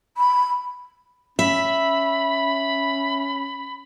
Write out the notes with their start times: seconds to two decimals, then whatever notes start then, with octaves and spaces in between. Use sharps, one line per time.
0.17 B5
1.39 C#4 E5 B5